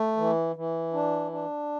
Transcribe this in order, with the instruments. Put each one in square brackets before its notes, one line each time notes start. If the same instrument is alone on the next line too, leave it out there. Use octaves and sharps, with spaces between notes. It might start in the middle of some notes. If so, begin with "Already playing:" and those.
Already playing: [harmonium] A3
E3
E3
D4
D4